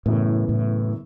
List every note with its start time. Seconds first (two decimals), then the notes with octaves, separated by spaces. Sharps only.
0.06 F#1 F#2 A2 E3 B3
0.49 A2